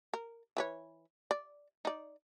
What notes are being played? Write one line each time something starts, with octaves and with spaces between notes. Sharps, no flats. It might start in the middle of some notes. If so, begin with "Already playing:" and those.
A#4
E3 B4 C#5
D5
D#4 D5